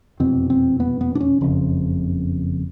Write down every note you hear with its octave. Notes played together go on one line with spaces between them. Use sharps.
F1 E2 B2 C4
C4
B3
B3
D4
C#4
F#1 F2 C#3